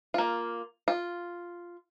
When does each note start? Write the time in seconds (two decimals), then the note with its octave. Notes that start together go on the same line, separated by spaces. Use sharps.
0.14 A#3 F4
0.88 F4